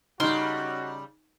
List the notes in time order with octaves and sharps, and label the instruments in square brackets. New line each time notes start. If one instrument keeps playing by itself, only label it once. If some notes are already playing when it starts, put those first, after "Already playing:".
[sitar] C#3 G3 [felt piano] D#4 [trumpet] F#4 [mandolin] C6 F6